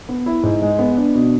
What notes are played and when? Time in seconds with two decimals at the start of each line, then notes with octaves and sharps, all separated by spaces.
0.09 B3
0.26 E4
0.43 G#2
0.62 G#3
0.79 B3
0.97 D4
1.15 B2